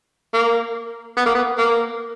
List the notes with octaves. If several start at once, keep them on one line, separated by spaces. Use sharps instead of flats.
A#3
B3
A#3
B3
A#3